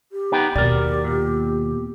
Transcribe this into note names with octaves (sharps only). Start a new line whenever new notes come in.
G4
B3 D#4 G5
D#2 B2 A#4 D5
A#2